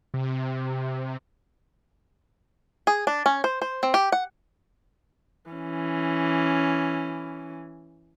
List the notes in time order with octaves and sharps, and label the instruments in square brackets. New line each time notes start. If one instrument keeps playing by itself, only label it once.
[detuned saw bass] C3
[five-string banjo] G#4
D4
C#4
C5
C5
C4
G4
F#5
[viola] E3 C#4